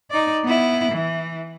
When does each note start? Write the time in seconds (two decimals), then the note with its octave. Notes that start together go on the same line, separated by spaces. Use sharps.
0.11 D#4 D5
0.44 B3 E4
0.92 E3